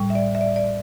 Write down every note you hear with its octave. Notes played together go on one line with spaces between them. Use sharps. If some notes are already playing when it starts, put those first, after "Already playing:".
Already playing: A2 G3
E5
D5
E5
D5
D5